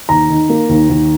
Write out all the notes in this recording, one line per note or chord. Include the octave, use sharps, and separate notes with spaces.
D#2 A#5
D#3
A#3
D#2
D#2